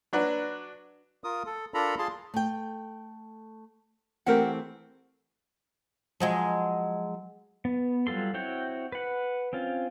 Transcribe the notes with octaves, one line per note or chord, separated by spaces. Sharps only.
F#3 D4 F#4 B4
F4 A#4 D#6
A4
D4 F4 A4 A#4 A#5 B5
F4 G#4 A5 C6
A3 G5
E3 A3 C4 G4 A#4 F#5
F3 F#3 G#3
B3
F#3 G3 F4 A4 C6
C4 E4 F#4 C#5 G5
B4 F#5
C4 C#4 F4